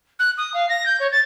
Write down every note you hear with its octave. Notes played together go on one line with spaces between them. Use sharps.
F#6
D#6
F5
A#6
G6
C#5
A6